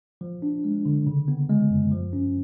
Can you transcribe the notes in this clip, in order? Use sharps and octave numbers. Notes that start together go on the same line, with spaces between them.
F3
D4
G#3
D3
C#3
B3
G#3
F#2
F3
C#4